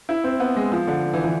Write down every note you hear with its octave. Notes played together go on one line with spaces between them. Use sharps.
E4
C4
B3
G#3
F3
D3
E3
E3